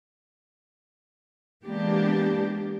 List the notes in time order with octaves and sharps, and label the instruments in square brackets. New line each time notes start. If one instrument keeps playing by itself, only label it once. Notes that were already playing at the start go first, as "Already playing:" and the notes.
[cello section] E3 G#3 A#3 B3 D4 G4